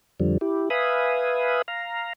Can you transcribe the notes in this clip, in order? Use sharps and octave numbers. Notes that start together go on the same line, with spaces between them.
F2 D3 F3 G3
E4 G4
B4 E5 F5 G#5 B5 D#6
F5 A#5